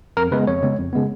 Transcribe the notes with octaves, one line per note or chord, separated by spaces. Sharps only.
F2 A#4
C#3 G#3 B3 B4
F2 C#5
C#3 G#3 B3
F2
C#3 G#3 B3